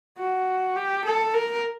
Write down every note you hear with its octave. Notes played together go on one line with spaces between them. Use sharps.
F#4
G4
A4
A#4